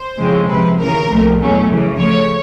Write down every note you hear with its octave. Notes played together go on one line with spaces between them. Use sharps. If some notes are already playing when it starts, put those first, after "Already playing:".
Already playing: C5
F2 C#3 E3 G#3 C4
C#2 C3 F3 B4
D#2 C#3 E3 A#4
C2 A#2 F3 A3
E2 B2 F#3 A3 C#4
F#2 C#3 E3
C#2 C#3 F3 A3 C#5